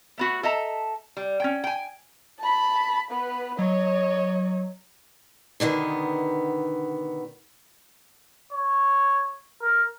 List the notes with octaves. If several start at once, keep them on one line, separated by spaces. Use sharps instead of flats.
A3 B3 F#4
A4 D#5 E5 A5 A#5
G3
C#4 G5
G5 G#5
A5 B5
B3 B4
F#3 C#5 D#5
B2 D3 D#3 B3
C#5
A#4